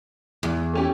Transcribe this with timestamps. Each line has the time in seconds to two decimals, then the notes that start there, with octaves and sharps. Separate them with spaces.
0.43 E2
0.73 A3 C#4 G4